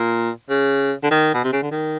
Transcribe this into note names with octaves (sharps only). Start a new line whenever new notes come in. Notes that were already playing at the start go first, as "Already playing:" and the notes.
Already playing: A#2
C#3
D3
D#3
B2
C3
C#3
D3
D#3